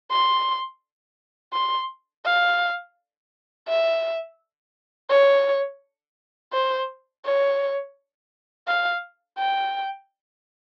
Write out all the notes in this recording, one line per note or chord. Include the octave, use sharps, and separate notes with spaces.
C6
C6
F5
E5
C#5
C5
C#5
F5
G5